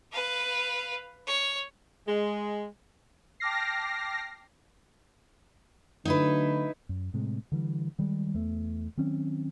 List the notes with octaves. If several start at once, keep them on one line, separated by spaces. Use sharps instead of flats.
B4 F5
C#5
G#3
G5 A5 D6 F6 A#6 C7
D3 F#3 A3 D#4 E4 B4
F#2
A2 C3 G#3
D3 E3 G3
D#3 G3 G#3
E2 A3
D#3 F#3 C4 C#4